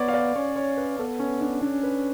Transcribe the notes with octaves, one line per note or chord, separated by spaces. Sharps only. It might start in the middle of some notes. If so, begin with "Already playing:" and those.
Already playing: B3 C#5 D5
F5
D5
C#4 C#5
C#5
B4
B3 A4
C#4
D4
C#4 D4
B4